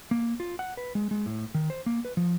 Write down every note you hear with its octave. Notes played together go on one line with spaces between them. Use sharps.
A#3
F4
F#5
B4
G#3
G#3
A2
D#3
C5
A#3
B4
F3